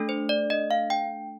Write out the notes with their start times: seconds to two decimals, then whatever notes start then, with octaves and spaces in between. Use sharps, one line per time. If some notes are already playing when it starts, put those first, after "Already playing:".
Already playing: A3 D4 A4
0.09 C5
0.29 D5
0.50 D#5
0.71 F5
0.90 G5